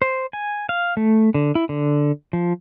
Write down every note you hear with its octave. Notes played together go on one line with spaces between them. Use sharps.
C5
G#5
F5
A3
D3
E4
D3
F3